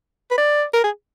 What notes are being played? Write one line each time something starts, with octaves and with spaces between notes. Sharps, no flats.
B4
D5
A#4
G#4